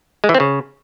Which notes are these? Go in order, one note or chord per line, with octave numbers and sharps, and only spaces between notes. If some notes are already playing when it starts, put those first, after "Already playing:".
G#3
E3
C4
C#3